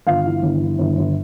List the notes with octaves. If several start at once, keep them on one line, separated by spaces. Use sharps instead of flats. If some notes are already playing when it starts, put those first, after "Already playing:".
G1 F4 F5
E3
G1
E3
G1
G1